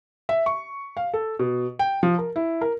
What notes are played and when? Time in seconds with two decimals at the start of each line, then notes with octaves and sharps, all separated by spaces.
0.29 E5
0.46 C#6
0.97 F5
1.14 A4
1.39 B2
1.79 G5
2.03 F3
2.18 A#4
2.36 E4
2.61 A#4